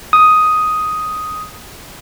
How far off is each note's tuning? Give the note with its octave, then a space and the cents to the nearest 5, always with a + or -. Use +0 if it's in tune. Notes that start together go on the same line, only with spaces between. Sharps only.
D#6 +5